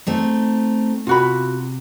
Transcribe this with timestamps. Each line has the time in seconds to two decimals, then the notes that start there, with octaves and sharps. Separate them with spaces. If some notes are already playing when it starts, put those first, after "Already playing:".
0.07 A3 C4 D#4
1.07 C3 F4 F#4 B5